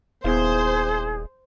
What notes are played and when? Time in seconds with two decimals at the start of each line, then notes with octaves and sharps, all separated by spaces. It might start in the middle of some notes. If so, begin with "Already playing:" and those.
0.24 D#1 B3 E4 G#4 C5 F5